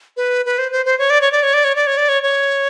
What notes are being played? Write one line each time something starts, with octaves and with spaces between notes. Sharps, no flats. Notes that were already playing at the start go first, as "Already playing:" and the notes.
B4
B4
C5
C5
C5
C#5
D5
C#5
D5
C#5
D5
C#5
D5
C#5
D5
C#5
C#5